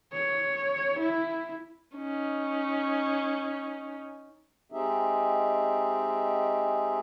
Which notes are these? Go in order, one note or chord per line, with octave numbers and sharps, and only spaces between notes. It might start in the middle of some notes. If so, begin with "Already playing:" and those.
C#5
E4
C#4 D#4
G#3 C4 D#4 G4 G#4 E5